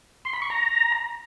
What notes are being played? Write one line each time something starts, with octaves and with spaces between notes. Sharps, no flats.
C6
B5
C#6
A#5